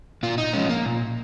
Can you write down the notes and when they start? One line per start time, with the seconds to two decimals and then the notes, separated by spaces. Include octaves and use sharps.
0.23 A#2 F4
0.38 D#4
0.53 F3 G#3 C#4
0.69 A#3
0.85 A#2